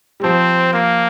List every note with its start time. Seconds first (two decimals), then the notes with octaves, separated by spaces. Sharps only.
0.20 G3
0.23 F3 C4
0.73 A#3